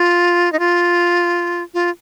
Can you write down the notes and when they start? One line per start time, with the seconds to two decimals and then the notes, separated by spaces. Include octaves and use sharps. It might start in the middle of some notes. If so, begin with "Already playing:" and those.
Already playing: F4
0.52 D#4
0.59 F4
1.74 F4